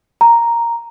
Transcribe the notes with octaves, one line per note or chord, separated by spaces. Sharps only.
A#5